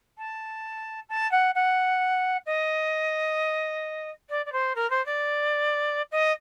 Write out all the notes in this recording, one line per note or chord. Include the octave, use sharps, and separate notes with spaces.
A5
A5
F#5
F#5
D#5
D5
D5
C5
A#4
C5
D5
D#5